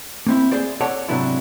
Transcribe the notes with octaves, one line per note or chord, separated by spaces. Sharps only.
A#3 C4 E4
G#4 C5 D5
A4 C#5 D5 F#5 A5
G#2 C3 F#3 B3 D4 E4